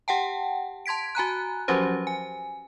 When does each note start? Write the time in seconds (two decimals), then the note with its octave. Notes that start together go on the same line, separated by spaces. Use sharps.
0.08 G4 F#5 G5 A5
0.86 A5 C6 G#6 B6 D7
1.15 F#4 G#5 A#5 F#6
1.68 F3 F#3 C#4 F#4 G4 C5
2.07 G#5